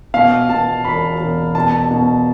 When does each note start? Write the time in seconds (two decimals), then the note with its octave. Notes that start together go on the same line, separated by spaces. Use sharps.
0.14 B2 F5
0.49 B2 A5
0.84 E1 B5
1.20 E1
1.55 B2 A5
1.91 B2